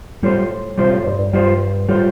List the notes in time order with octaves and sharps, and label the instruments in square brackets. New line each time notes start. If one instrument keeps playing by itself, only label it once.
[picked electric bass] A2 [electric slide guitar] G3 F4 C5
[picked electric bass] C3 [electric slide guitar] G3 F4 C5
[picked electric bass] A2
G2
G2
[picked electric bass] G2 [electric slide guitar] G3 F4 C5
[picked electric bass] A2 [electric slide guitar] G3 F4 C5